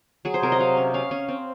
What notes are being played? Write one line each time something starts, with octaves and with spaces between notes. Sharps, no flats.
F#3 G#4
C5
C3 A#4
D#5
F#3 F5
C#4
C#4 F5
C#4
C4